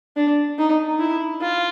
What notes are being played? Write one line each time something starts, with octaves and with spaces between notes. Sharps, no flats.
D4
D#4
E4
F4